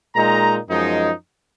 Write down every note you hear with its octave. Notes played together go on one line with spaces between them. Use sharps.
A#2 G#3 D#4 A#5
F#2 F3 G#3 D#4